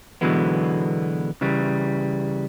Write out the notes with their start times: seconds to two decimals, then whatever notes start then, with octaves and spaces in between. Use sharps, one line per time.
0.21 B2 D3 E3 F#3 G#3 B3
1.41 C#3 E3 G3